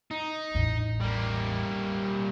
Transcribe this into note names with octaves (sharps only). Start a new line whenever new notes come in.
D#4
A1 E2
G3 A#3